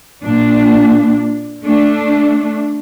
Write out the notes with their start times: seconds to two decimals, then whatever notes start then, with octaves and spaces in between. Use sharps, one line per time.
0.23 A#2 D4
1.64 A3 D4